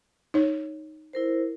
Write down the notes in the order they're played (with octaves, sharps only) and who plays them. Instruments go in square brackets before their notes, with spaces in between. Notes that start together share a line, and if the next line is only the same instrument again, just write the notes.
[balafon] D#4 C#5
[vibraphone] E4 A#4 C5